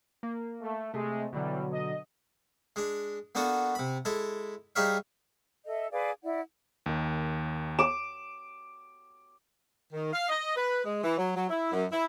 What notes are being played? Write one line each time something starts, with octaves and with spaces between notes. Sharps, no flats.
A#3
A3
C3 G#3 A3
B2 D3 E3 F#3 G3
D#5
G#3 D4
A#3 B3 D4 F#4 A4
C3 B5
G#3 E4 A4
G3 D#4 G#4 C#5 E5 F5
A4 D#5 E5
G#4 B4 D5 F5
E4 D5 F#5
D#2 D#3
D6 E7
D#3
F5
D#5
B4
G#3
E3
F#3
F#3
E4
F#2
E4